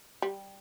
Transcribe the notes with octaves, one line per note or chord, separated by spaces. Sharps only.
G3